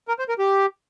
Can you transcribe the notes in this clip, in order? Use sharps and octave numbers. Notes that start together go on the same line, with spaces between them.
A#4
C5
A#4
G4